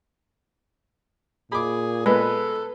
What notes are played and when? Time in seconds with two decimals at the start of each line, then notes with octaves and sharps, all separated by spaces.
1.52 A#2 G#4 B5 D6
2.06 G#3 B3 A4 B4